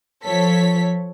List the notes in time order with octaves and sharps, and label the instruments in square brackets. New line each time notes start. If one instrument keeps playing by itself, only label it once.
[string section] F3 A4 C#5 B6